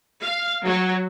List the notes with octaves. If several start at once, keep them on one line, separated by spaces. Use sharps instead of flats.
F5
F#3